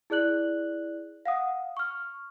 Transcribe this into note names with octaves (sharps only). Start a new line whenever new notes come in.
E4 G#4 D5 F#6 F#7
F5 F#5 D#6
C#6 F6